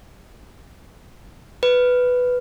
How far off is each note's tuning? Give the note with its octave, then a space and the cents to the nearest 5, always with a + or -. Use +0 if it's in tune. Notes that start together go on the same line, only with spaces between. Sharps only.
B4 +5